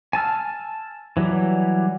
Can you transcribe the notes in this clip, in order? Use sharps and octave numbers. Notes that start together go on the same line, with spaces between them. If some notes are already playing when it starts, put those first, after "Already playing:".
G#5 A5 E6 F6
E3 F#3 G3